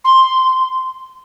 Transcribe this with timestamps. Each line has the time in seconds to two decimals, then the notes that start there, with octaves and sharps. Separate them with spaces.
0.04 C6